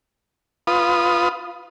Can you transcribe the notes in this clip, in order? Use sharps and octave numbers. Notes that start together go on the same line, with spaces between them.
F4 B4 D#6